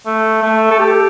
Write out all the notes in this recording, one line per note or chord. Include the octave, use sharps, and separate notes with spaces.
A3
A3
A4
G4